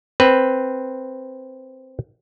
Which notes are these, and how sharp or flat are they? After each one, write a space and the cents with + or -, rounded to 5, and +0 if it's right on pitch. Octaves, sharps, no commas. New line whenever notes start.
C4 +0 B4 +0